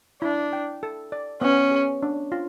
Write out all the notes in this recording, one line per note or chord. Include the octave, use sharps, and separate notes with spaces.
D4 E4
G5
A4
D5
B3 C#4
G#4
D4
F4